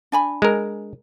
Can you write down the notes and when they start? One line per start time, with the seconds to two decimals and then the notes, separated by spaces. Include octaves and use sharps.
0.12 D4 G#5 B5
0.42 G#3 A#4